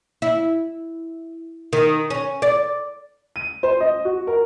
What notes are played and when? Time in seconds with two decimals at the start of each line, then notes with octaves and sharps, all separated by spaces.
0.22 E4
1.73 D#3
2.10 C#4
2.42 D5
3.36 D#7
3.63 C5
3.80 D#5
4.05 F#4
4.27 A#4